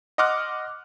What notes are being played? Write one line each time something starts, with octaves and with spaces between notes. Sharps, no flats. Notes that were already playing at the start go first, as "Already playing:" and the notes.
D#5 F#5 C6 D6 F6 F#6